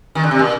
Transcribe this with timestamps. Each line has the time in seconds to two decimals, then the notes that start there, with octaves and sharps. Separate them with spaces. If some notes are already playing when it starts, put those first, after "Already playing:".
0.15 D#3
0.23 D3
0.31 C3
0.39 A#2